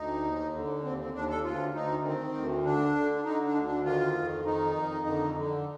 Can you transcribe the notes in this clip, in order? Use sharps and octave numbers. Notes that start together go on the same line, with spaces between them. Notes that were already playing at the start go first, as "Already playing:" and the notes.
Already playing: D2 D#4
D#2
D3
D#2 C4
C4
D#2 D4
A4
D2 F4
D2 D#4
D#3 C4
D2
D3 D4
D3
D3 D#4
D4
D2
D4
D#3 F4
F2
D#3 D#4
F2
D3
D3